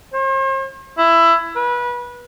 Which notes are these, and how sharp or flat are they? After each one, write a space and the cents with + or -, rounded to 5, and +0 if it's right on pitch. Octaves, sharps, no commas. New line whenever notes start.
C5 +45
E4 +15
B4 -25